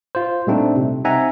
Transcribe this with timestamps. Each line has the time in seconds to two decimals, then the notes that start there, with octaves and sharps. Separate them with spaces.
0.15 F4 C5
0.47 A#2 G3 A3 C4 D4 D#4
0.76 C3
1.05 C4 D#4 E5 F#5 G#5 A#5